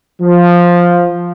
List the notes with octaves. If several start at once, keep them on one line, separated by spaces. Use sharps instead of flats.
F3